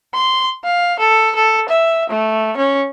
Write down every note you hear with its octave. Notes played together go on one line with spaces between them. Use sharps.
C6
F5
A4
A4
E5
A3
C#4